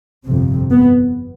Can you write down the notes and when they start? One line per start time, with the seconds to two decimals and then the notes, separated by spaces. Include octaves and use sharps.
0.26 G1 F2 C3
0.70 B3